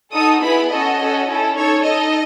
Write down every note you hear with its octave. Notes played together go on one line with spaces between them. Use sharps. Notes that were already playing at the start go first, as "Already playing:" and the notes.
D#4 F#4 A4 D#6
B3 E4 G#4 B5
C#4 F#4 A4 D#5
C#4 F#4 A4
C#4 E4 A4
D#4 A4 C#5
D#4 A4 D#5